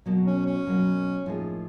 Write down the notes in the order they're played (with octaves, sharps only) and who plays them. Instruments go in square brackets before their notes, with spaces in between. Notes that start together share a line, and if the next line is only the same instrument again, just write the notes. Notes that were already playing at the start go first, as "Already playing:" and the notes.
[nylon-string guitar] B2 F#3 A#3
[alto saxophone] C#4
C#4
[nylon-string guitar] B2 F#3 A#3
A2 F3 A#3 D#4 G#4